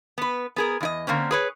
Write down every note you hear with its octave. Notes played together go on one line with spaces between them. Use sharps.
B3 B4
B3 G#4 A#4
E2 E4 D#5
D3 A#3 C4 C#4
G#4 B4 C#5